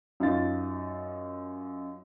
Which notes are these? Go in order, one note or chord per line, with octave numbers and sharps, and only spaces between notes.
F#2 D#4 F4 A6